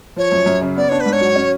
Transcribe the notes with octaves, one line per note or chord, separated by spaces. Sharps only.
F3 C#5
F#2
F#2
C#3
B3 D5
D4 C#5
B4
G#2
C#5
F#3
C#4